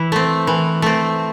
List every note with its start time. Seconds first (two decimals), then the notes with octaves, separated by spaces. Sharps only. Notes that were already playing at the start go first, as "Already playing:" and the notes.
Already playing: E3 E4
0.12 A3 C4
0.47 E3
0.82 A3 C4